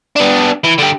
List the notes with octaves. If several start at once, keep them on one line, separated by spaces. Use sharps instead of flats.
B3 D4
E3
D3 G4